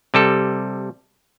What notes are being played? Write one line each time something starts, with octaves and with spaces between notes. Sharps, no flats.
C3 G3 A4